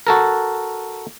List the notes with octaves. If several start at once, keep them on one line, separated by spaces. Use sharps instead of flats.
F#4 A4 A#4